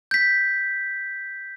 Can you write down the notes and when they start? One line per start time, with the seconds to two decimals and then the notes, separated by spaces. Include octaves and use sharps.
0.11 G6 B6